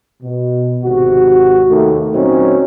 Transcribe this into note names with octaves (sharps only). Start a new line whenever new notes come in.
B2
G#1 C3 F#4
D#2 D#3 A3
A#2 F#3 C4 C#4 D#4